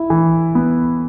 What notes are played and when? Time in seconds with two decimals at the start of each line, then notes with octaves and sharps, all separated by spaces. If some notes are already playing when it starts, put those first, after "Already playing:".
Already playing: E4
0.10 E3
0.55 B3